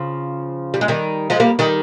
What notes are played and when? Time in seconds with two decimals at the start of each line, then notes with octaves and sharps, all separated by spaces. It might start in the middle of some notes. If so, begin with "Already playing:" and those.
Already playing: C#3 F3
0.74 G3
0.81 G#3
0.88 D#3 G3
1.30 F3 G#3
1.40 G3 A#3
1.59 D#3 G3